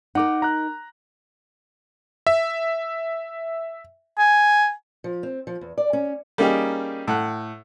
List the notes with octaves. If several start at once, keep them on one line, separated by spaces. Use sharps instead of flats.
D#4 A#4 F#5 D6
A#5 F#6
E5
G#5
F3
C4
F3
E2
D5
C#4
G3 A#3 C#4 D#4 G4 G#4
A2 F#5 F#6